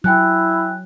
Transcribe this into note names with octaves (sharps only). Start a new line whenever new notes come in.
F#3 E4 G5 G#5 F#6